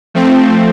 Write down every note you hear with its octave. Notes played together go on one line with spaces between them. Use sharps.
F3 A3 C4